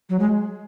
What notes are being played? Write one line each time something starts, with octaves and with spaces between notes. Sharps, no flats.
F#3
G#3